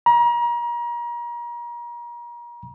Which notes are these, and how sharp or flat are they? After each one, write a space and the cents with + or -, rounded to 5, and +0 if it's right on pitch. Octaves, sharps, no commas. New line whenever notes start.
A#5 +35